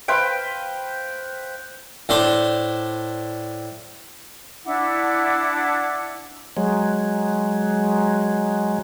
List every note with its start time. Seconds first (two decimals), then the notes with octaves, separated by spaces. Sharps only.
0.08 B4 C5 F5 G5
2.09 A2 D4 C5
4.66 D4 E4 F#5 D6
6.57 F#3 G#3